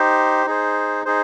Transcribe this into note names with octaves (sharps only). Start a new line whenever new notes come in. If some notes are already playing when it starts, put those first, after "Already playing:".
Already playing: D#4 G4 C5
D#4 G#4 C5
D#4 G#4 C5